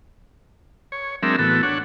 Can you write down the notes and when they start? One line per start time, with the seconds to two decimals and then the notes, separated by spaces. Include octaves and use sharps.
0.92 C#5
1.23 F#3 G#3 C4 D4 A#4 E5
1.39 A2 E3 B3 F#4 A4
1.63 D4 C#5 F#5